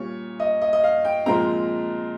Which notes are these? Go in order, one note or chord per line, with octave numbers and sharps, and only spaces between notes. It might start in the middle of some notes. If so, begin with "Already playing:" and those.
Already playing: A#2 G3 C#4 C#5
D#5
D#5
D#5
F5
G5
A#2 F3 G#3 C4 A#5